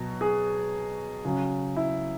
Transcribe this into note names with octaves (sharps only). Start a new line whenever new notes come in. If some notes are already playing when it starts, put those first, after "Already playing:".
Already playing: B2 F#3
G#4
C#3 F#3
E4